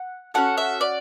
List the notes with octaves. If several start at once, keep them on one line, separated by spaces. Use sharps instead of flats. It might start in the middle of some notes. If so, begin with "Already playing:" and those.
Already playing: F#5
C#4 F#4 A4 F#5
E5
D5